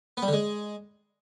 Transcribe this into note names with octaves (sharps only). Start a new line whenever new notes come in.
B3
G3
D3
G#3